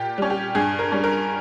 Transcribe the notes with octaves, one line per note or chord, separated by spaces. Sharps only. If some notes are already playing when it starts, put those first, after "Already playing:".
Already playing: A#2 G4
G3 C#4
G4
G2 G#4
A#4
G3 C#4
A#4